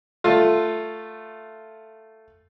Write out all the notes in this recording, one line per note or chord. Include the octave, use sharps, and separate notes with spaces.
A3 F4